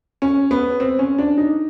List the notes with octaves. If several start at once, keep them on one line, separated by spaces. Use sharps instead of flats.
C#4
B3
C4
C#4
D4
D#4